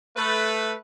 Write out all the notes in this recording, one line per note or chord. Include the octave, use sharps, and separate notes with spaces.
A3 B4